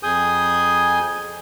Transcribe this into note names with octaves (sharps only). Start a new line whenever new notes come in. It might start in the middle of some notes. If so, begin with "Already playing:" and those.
F2 G#4 G#5 D#6 G6